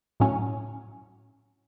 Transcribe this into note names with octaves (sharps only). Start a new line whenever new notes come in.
A2 F#3 C#4